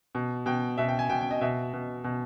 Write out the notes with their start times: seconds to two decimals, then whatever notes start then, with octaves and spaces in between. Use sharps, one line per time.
0.15 B2
0.46 B2 G5
0.78 B2 E5
0.88 G5
0.99 G#5
1.10 B2 G5
1.21 G5
1.31 D#5
1.41 B2 E5
1.73 B2
2.04 B2